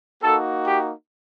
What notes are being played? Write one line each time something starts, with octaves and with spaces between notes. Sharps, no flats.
A#3 D#4 F#4 A4
G4